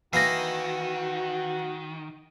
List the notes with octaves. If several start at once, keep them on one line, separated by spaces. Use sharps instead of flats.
D#3 E3 A#3 D#4 F#4 A#6 C7